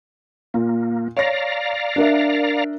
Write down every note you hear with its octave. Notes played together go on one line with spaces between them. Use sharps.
A#2 A#3
C#5 D5 F5 A#5 A#6
D4 A#4 E5